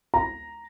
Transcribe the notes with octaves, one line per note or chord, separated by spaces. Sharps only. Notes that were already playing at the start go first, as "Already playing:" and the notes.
A#5